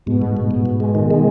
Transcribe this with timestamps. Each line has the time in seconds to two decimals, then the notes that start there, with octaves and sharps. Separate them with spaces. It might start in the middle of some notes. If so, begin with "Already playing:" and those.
0.06 G#2 B2
0.22 G#2
0.37 G#2
0.51 G#2
0.66 G#2
0.80 G#3
0.95 D#3
1.11 G#3